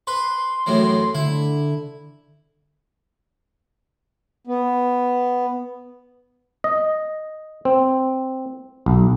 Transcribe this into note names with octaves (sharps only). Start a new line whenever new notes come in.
B4 C6
F#2 A2 E3
D3 E4
B3
D#5
C4
B1